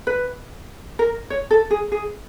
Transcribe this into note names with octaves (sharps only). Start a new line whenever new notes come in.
B4
A#4
C#5
A4
G#4
G#4